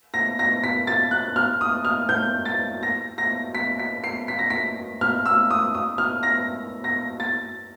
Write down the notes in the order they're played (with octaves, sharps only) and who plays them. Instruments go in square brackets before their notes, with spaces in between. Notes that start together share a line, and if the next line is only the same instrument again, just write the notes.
[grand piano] A#6
A#6
B6
A6
F#6
F6
D#6
F6
G6
A6
A#6
A#6
B6
B6
C7
B6
A#6
B6
F6
E6
D#6
D#6
F6
A#6
A#6
A6